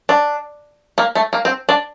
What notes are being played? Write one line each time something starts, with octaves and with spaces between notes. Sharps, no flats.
D4
A#3
A3
A#3
C4
D4